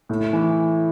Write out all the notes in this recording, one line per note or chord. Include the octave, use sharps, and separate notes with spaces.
A2
E3